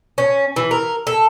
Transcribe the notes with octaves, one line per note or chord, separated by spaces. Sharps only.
C#4
E3
A#4
A4